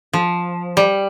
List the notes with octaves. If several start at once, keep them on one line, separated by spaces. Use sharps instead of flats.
F3
G3